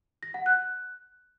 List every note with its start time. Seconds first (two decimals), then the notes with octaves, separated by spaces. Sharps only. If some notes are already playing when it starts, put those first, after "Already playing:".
0.23 A#6
0.34 F#5
0.46 F#6